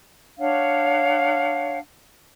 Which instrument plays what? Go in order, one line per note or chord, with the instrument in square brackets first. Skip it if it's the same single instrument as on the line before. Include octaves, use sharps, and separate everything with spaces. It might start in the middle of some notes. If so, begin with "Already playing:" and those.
[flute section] D4 C#5 F5 F#5